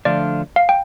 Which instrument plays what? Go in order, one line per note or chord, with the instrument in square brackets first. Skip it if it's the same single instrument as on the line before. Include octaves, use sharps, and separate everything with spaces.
[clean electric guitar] D3 F3 A3 D4 F4 [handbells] D5
[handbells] F5
G5